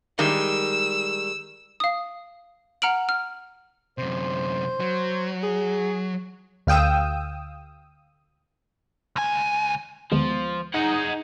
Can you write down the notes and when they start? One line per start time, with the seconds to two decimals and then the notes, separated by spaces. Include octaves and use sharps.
0.19 D#3 G3 G#3 E6
1.80 F5 D#6
2.82 F#5 A#5 F6 D7 F#7
3.09 F6
3.98 F#2 C3 C5
4.80 F#3
5.43 G#4
6.67 D2 F5 G5 D#6 E6
9.16 C#2 G#5
10.12 D#2 F3 G#3 B3
10.74 D#4 G#4 F#5